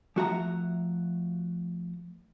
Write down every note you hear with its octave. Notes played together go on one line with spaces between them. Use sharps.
F3 A3 F#4 E5 G#5 A#5